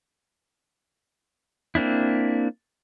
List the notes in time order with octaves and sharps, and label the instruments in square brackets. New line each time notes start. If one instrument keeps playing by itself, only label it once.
[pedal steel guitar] A#3 C4 D4 E4